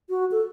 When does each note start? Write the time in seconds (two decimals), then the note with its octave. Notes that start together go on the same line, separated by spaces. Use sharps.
0.09 F#4
0.31 A4